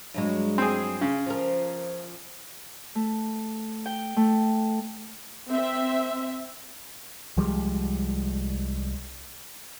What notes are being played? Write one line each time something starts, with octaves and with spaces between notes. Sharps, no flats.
G2 F#3 G#3
C4 G#4
C#3
F3 A#4
A3
G5
A3
C4 E5
C2 F3 G3 G#3